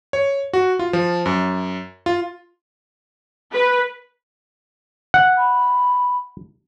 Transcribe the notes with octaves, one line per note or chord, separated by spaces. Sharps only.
C#5
F#4
F4
F3
F#2
F4
B4
F#5
B5